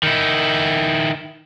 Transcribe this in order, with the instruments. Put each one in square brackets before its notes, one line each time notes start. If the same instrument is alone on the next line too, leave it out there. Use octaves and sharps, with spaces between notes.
[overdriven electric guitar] D#3 E4